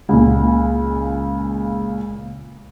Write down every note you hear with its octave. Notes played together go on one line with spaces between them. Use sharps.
C#2 A#2